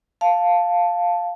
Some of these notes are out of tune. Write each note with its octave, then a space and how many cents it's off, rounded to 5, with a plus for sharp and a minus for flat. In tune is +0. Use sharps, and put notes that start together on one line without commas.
F5 +5 A5 +0